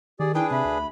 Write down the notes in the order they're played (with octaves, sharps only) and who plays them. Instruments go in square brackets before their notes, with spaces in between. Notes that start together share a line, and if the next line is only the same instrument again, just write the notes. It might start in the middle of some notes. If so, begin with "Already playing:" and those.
[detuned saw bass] D#3 [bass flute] G4 [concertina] G#4 D5
[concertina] D4 G#4 B4 [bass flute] E4 [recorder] G5
[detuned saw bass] C3 [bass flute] E5 [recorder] B5
[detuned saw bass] D2